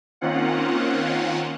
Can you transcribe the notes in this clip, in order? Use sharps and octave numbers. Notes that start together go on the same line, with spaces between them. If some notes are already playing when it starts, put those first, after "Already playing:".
D#3 A#3 C4 C#4 F4 F#5